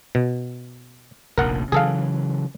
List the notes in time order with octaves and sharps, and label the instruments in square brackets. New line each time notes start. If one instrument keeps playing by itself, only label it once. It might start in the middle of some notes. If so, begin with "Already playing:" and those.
[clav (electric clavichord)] B2
[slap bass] F1 A#1 D#2 [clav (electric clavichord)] A#4 F#5
[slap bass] C#3 E3 F#3 [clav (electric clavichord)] G#4 A4 F5